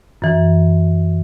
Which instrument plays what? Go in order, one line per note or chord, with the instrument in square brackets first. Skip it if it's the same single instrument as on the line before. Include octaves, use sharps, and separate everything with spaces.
[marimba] F#2 E3